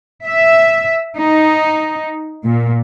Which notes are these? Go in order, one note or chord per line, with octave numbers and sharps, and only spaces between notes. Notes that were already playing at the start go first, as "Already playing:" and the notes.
E5
D#4
A#2